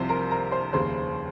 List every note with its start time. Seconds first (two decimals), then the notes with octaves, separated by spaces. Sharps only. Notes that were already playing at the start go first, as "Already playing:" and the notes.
Already playing: C2 C3 F3 C5 C6
0.09 A#4 A#5
0.31 A#4 A#5
0.51 C5 C6
0.73 F1 D#2 C#3 C5 C6